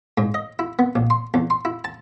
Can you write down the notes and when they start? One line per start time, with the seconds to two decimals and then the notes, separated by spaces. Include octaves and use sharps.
0.18 G#2
0.34 D#5
0.59 E4
0.79 B3
0.96 A#1
1.10 C6
1.34 E2
1.50 C6
1.65 E4
1.84 A5